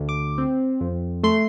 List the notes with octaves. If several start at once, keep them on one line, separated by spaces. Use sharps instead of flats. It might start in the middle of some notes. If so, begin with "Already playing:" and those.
Already playing: D2
D6
C4
F2
A3 C6